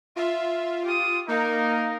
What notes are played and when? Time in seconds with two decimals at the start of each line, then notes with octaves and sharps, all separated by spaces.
0.16 F4 E5
0.84 G4 D#6
1.28 A#3 D#4 A#4 F5